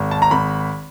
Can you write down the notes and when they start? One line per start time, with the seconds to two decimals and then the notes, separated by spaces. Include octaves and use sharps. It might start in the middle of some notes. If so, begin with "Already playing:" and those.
Already playing: G#1
0.11 A5
0.22 A#5
0.31 G#1 B5